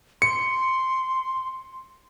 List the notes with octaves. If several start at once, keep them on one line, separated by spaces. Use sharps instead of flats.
C6 C#7